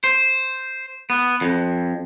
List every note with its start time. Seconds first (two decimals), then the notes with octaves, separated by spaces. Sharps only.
0.04 C5
1.10 B3
1.41 F2